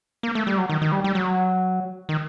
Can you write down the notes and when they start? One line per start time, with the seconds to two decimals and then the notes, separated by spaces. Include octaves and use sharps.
0.23 A#3
0.35 A3
0.47 G3
0.58 F#3
0.69 D#3
0.82 D#3
0.92 G3
1.04 G3
1.15 F#3
2.09 D#3